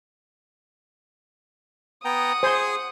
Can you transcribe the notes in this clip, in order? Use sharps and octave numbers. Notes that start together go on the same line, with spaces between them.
B3 F#5 G5 A#5 D#6
G#4 C5 G#5 C6